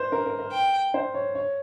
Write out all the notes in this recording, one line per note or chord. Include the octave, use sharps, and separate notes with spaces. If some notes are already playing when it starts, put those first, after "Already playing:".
Already playing: B4 C5
A#4
A#4
A#4
G5
C5
C#5
C#5